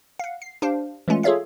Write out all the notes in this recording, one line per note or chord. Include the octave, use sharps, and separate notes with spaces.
F5 F#5
C7
D4 G4 C5 F5
E3 G#3 A3 C#4 F4
F4 G#4 A4 C#5 E5 F5